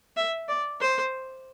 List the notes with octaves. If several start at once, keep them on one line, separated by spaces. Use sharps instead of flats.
E5
D5
C5